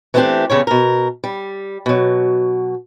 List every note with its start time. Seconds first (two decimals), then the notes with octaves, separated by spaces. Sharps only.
0.14 E3 A3 B3 C4 D4 G4
0.50 E2 C#3 G3 C#5
0.67 B2 A#4
1.24 G3
1.86 B2 F#3